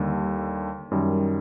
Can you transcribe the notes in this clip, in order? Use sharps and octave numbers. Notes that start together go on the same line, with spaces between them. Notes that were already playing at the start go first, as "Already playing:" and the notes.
Already playing: D#2 D3 G3
F#2 D#3 G3